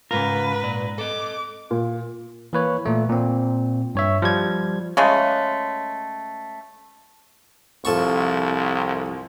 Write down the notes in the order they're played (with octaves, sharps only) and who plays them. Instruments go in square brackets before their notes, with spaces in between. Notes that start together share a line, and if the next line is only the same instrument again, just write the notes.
[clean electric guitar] G#2 A#4 [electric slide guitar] C#3 F4 [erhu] B4
[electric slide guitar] A#2 D5
[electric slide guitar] A4 D#5 [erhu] D6
[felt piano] A#2
[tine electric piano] E3 A#3 B4 C#5
A#2 A3
A#2 C4
G2 C#5 E5
F3 G3 G#6
[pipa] C#3 G#3 A3
[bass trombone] C2 [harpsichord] F2 A5 C#6